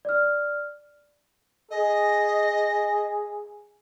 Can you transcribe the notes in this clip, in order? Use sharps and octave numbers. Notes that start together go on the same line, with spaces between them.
D5 F6
G#4 D#5